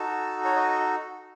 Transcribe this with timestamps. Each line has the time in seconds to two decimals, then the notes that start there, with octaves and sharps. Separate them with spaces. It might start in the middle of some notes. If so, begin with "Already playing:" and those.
Already playing: D#4 F#4 A4 A5
0.45 C#5
0.56 D#5